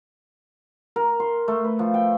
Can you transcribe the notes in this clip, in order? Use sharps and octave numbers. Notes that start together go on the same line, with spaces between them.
A#4
C6
A3
B4
F3
G5